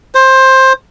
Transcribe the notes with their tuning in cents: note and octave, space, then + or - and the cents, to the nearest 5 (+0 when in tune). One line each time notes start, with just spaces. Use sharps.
C5 +15